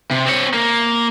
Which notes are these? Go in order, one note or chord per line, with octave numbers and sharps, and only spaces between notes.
C3
C4 C#5
A#3